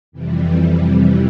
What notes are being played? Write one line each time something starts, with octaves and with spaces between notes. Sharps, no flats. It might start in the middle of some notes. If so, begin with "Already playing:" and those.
F2 C3 E3 G3